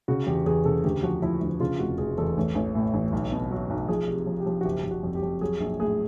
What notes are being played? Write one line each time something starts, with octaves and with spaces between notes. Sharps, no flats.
C#3 F#4
E2 G4
E2 G#4
C#3 A4
D2 G4
F3 F#4
F3 E4
D2 E4
C#3 F4
F1 F#4
F1 G#4
E2 A4
A1
A1
A2
A1
B1
B2
F#3
B1
F3 G#4
C3
F3
G4
F3
F#4
F#1 G4
F#1
F#4
F2
G4
F2
F#3 G#4
A#1
A2 G#4